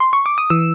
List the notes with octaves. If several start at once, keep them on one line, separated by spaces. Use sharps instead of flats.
C6
C#6
D6
D#6
E3 E6